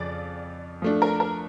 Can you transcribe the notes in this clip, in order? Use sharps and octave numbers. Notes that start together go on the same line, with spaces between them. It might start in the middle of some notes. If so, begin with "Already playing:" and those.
Already playing: F2 C#3 F3 C#4 D5
F3 A3 D4
A#4
A#4